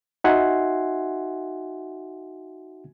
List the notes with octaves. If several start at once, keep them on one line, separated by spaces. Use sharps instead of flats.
D#4 F#4 E5 F#5 G#5 C6